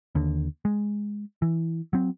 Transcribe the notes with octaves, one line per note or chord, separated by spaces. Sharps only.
D#2 D3
G#3
E3
F#3 C4